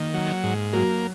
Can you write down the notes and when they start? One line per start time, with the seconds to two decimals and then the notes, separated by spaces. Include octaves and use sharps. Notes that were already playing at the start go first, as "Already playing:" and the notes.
Already playing: D#3 A#3
0.14 F#3
0.44 G#2
0.73 F#3 A#3